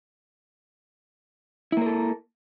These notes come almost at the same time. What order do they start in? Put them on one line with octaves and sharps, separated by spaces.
E4 A#3 A#4 A4